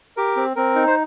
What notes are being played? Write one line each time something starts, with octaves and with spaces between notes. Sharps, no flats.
G4 A#4
C4
C4 A#4
D#4
C5